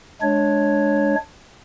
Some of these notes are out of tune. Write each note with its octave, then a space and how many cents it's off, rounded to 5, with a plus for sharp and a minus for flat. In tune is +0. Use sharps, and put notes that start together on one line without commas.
G#3 +20 D4 +0 C#5 +0